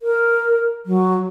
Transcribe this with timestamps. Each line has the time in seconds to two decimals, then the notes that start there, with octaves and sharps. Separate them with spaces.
0.01 A#4
0.86 F#3